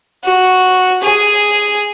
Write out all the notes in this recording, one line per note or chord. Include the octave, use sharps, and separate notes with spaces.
F#4
G#4 G#5